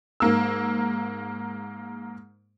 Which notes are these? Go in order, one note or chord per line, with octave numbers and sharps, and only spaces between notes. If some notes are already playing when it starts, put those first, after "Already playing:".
G#2 A#3 E6